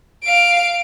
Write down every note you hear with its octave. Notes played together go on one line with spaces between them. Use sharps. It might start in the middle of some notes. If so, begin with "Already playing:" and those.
F5 D7